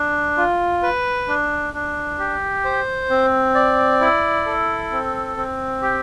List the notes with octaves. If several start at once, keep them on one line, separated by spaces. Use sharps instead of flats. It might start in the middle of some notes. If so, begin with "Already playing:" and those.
Already playing: D4
F4
B4
D4
D4
G4
C5
C4
D5
E4
A4
C4
C4
G4